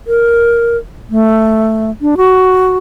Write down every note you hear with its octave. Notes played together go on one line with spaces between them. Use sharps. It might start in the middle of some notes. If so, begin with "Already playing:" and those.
A#4
A3
D4
F#4